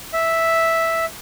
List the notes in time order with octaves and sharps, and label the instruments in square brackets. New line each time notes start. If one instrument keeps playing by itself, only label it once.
[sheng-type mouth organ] E5